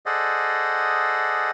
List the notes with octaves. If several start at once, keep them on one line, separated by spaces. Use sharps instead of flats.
G#4 A4 C5 D5 D#5 F#5